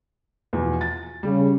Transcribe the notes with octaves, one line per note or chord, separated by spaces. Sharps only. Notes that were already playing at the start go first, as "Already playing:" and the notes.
E2 B2 F3
A6
C#3 G3